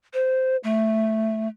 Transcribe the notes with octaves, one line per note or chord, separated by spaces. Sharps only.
C5
A3